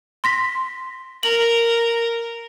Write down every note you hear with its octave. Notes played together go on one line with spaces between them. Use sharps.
C6 A#6 B6
A#4 F#7